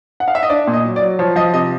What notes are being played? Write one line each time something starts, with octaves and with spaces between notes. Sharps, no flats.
F#5
F5
E5
D#5
D4 D5
A#2
D#5
F#3
D5
F#3
F3 C#5
F3 D#5
C3 D#5